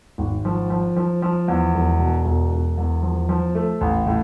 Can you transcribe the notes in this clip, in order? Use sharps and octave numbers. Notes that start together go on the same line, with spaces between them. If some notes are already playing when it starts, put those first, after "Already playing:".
G#1
F3
F3
F3
F3
E2
E1
B2
E1
E1
E2
F3
F3
A3
A1
A2